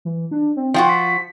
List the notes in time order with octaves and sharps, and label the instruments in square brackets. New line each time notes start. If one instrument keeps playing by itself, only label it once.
[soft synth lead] E3
D4
C4
[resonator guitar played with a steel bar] F3 F4 F#4 [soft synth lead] G5
[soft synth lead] B6